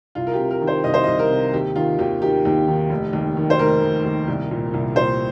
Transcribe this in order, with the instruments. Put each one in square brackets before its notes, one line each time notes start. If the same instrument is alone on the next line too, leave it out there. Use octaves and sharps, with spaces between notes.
[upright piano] C2 F4
A#4
C3 G4
A#4
D#3
C5
C2 D#5
C5
C2 D#5
A#4
C3
D#2 G4
D#3 F4
D#2 G4
D#3 G4
D#2
D#3
F1
D#2
D#3
C5
F1 A#4
F1
D#2
C2
A#2
C2
A#2 C5